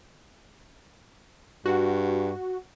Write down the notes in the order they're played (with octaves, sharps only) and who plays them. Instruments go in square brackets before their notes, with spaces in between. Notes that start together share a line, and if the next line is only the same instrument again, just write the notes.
[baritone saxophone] G2 [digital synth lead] F#4